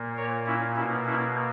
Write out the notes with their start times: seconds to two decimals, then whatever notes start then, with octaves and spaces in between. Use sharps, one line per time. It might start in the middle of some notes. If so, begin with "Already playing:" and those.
Already playing: A#2 A#3
0.17 A#4 C#5
0.46 C#4 E4
0.76 B2 A#3 C#4 E4
1.05 C#4 E4